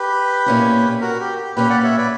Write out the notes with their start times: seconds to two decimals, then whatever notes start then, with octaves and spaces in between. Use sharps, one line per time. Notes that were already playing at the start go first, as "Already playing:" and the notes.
Already playing: G4 B4
0.46 A#2 A#3 C#4 E4
1.01 F#4 A#4
1.20 G4
1.38 G4
1.56 A#2 A#3 C#4 G4 B4
1.70 D5 F#5
1.84 C#5 E5
1.97 B4 D5